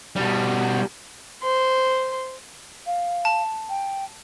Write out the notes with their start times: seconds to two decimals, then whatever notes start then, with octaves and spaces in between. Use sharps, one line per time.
0.16 B2 G3
1.43 C5 C6
2.87 F5
3.25 A5
3.69 G5